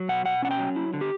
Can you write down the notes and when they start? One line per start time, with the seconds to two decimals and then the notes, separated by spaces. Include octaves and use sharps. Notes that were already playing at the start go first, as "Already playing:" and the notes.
Already playing: F#3
0.09 B2 F#5
0.25 B2 F#5
0.42 C#4 F#5
0.51 G5
0.59 F#3
0.76 E4
0.93 D3
1.01 G4